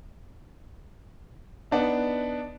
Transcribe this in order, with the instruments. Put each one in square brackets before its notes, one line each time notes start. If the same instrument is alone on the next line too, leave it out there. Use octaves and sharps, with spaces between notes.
[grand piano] B3 D4 D#4